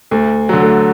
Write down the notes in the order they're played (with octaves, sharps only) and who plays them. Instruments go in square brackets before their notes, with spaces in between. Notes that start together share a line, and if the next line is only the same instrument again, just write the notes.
[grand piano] D2 [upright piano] A3
[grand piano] D3 F#3
[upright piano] A3